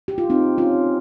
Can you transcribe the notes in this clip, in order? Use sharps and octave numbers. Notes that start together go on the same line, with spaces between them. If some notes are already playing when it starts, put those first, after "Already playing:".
G4
F4
C4 D#4
C#4 F4